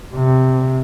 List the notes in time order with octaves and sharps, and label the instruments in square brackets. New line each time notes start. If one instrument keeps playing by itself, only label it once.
[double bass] C3